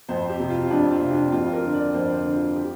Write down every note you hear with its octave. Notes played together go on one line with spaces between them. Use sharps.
F2 C5
G4
C3
F4
F2 D4
F4
C3
D4
F2 F4
A#4
D3
D5
F2 C5
C5
D3
F4
G4